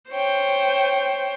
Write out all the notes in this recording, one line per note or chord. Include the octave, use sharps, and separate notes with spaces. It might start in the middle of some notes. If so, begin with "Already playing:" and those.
C5 C#5 G5